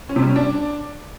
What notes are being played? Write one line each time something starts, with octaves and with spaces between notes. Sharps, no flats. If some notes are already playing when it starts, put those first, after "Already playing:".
C#4
C3
G3
C#4
D4